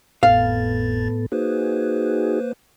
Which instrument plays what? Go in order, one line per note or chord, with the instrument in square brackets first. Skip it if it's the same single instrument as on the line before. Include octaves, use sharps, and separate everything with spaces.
[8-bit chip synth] G#1 F2 A6 [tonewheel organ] A2 B3 A4 [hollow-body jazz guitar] F5
[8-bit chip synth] A#3 B4 C5 [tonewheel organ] D#4 F#4 G#4